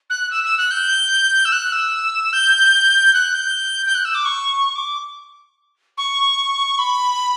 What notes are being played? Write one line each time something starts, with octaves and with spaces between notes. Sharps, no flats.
F#6
E6
E6
F#6
G6
E6
F#6
E6
G6
F#6
G6
G6
F#6
E6
D6
C#6
D6
C#6
B5